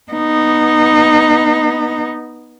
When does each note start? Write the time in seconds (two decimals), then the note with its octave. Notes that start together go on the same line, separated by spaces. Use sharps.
0.12 B3 D#4